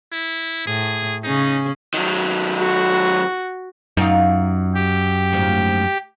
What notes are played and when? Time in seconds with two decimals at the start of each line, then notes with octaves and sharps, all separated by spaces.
0.13 E4
0.67 A2 G#4
1.24 C#3 C#4 D#4 G#4
1.94 D#3 F#3
2.59 F#4
3.97 F#2 D#4 F4
4.74 G4
5.32 D2 G#2 F3